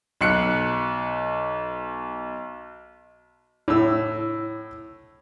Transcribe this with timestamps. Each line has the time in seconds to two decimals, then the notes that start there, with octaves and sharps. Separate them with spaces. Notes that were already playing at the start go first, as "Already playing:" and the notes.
0.21 B1 F#6 C#7
3.68 A2 E6